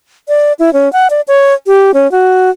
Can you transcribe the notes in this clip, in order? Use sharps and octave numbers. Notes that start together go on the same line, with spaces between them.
D5
E4
C#4
F#5
D5
C#5
G4
C#4
F#4